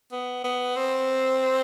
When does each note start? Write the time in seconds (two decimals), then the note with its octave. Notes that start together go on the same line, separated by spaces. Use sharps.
0.12 B3
0.44 B3
0.76 C4